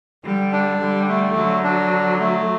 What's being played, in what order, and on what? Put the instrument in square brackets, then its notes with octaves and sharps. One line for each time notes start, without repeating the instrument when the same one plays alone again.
[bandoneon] D3 [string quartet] G3
[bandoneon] D4
[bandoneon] D3 [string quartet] G3
[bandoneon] A3
[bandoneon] D3 [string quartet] F#3
[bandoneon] D4
D3
A3